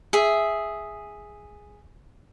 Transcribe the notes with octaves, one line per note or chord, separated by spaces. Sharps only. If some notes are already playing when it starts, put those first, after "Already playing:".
G#4 E5